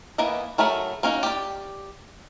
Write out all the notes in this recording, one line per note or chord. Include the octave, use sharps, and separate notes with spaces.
E3 A#3 B3 D#5
F#3 A3 G#4 A#4 B5
A#3 C#4 D#4 F#4
G4 D5